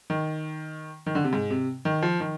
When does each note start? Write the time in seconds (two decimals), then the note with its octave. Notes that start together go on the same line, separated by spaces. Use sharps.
0.10 D#3
1.07 D#3
1.15 D3
1.24 C3
1.33 G#2
1.50 C3
1.85 D#3
2.02 F3
2.20 D#3